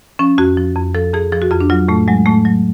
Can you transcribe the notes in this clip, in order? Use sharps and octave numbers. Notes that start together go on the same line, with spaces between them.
F3 C#4
F2 F#4
F3
F2
F3 A4
F2 G#4
F3 G#4
F#4
F2 F4
D4
F#3 F4
A2 A3
F#3 G#3
A2 A3
F#3